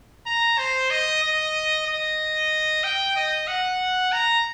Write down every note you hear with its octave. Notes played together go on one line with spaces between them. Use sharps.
A#5
C5
D#5
D#5
D#5
G5
D#5
F#5
A#5